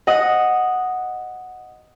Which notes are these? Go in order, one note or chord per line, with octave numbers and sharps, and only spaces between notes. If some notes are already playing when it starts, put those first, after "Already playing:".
D#5 F#5 D#6